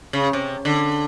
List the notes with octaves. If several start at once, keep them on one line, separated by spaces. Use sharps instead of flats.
C#3
C3
D3